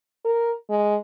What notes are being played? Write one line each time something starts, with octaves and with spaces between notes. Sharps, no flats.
A#4
G#3